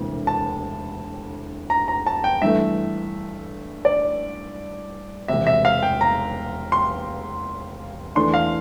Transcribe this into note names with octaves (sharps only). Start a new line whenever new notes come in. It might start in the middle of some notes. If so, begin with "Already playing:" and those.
Already playing: E1 D2 C3 E3 A#3
A5
A#5
A#5
A5
G5
G2 E3 A3 E5
D5
E1 E2 C3 E5
E5
F5
G5
A#5
C6
E2 E3 A3 D4 C6
F5